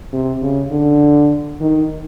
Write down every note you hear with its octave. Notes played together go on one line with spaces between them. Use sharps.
C3
C#3
D3
D#3